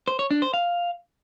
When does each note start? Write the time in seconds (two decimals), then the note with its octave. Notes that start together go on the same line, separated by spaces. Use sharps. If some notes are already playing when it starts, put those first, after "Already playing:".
0.08 C5
0.19 C#5
0.31 D4
0.42 C5
0.54 F5